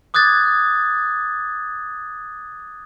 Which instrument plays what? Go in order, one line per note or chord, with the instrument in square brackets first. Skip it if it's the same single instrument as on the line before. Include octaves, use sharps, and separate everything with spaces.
[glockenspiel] D6 D#6 F#6 G#6 A6